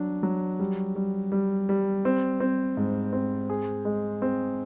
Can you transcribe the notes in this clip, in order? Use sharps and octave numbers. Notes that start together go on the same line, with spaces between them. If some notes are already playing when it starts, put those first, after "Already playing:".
Already playing: F#3 D4
F#3
G3
G3
G3
G3
C4
C4
G#2
C4
G#4
G#3
C4